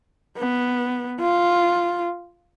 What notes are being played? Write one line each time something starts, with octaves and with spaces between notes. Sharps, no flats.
B3
F4